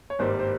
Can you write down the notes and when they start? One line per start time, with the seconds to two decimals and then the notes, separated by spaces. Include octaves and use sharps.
0.10 C#5
0.19 G#1 G2 G3 A#3 C5
0.39 C5